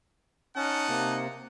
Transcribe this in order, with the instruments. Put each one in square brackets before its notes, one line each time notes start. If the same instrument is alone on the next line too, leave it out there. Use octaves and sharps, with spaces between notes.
[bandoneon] C#4 [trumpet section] D#4 F#5 A5
[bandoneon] C3 A#3